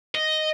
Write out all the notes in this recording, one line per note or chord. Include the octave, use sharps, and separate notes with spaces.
D#5